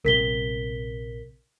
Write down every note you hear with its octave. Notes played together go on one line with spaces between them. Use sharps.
A#1 C3 A#4 B6 G7